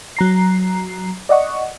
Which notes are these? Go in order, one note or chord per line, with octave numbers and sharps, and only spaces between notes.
F#3 A#5 C7
D5 D#5 F#5 C#6